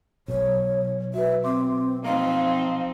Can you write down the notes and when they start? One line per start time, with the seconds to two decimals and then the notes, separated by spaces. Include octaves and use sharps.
0.28 B1 C#5
1.14 F#4 B4 E5
1.44 C4 C6 D6
2.04 F3 C4 D#4 F5